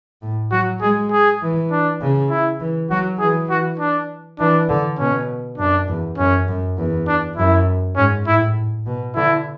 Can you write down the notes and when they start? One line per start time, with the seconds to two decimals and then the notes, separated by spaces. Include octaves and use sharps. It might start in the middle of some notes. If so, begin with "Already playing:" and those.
0.22 A2
0.52 F#3 F#4
0.81 G#3 G#4
1.12 G#4
1.42 E3
1.71 D4
2.01 C#3
2.30 E4
2.60 E3
2.90 F#3 F#4
3.19 E3 G#4
3.50 F#4
3.80 D4
4.39 E3 D4
4.69 D3
4.99 B2 C#4
5.58 F#2 D4
5.88 E2
6.18 F#2 C#4
6.48 F#2
6.77 E2
7.08 D4
7.37 F#2 E4
7.96 G#2 C#4
8.27 A2 E4
8.86 B2
9.15 D3 E4